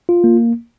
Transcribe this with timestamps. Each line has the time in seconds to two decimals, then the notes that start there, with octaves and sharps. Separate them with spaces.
0.09 F4
0.24 A#3